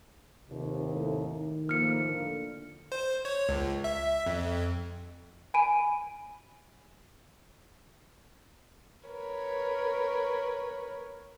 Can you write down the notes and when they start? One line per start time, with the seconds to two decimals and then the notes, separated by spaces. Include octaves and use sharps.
0.49 F1 D#2 C3
0.94 A2
1.23 D#3
1.69 A2 F3 A#3 F6 C#7
2.09 D3
2.92 C5
3.25 C#5
3.49 C#2
3.84 E5
4.26 F2
5.54 G#5 B5 D7 D#7
9.08 A#4 B4 C#5